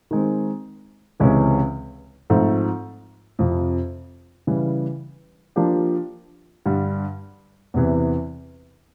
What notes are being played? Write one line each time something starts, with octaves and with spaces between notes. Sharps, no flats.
D#3 G#3 C4
C#2 C3 E3 G#3 C#4
G#2 F3 A3 C4
F2 C3 F3
C#3 E3 G3
F3 A#3 D4 G4
G2 D3 G3
E2 C3 E3